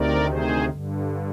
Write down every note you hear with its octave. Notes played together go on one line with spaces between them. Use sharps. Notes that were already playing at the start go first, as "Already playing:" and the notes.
Already playing: D2 C3 D#3 A#4 D5
G#4 C5
G2 D3